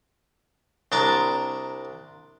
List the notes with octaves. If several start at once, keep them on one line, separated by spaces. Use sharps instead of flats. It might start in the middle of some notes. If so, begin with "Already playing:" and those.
C2 D4 D5 A#5